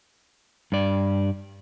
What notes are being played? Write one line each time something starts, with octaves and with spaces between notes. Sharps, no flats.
G2 D5